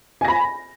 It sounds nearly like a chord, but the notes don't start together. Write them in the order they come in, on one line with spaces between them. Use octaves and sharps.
G#5 A#6 B5